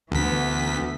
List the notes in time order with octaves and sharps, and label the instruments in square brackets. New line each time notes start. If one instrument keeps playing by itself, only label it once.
[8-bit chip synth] D2 B6 [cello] E3 B3